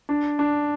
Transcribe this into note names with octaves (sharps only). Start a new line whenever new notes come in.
D4
D4